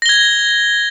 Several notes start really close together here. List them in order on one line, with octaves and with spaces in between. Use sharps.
A#6 G7 G#6